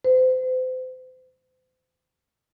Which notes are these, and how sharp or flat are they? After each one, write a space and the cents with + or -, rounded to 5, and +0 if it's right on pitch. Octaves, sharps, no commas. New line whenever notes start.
C5 -35